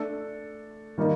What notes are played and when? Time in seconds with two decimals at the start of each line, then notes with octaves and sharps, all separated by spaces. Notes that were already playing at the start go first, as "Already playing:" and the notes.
Already playing: A3 D4 A4
0.98 D#3 G3 A#3 D#4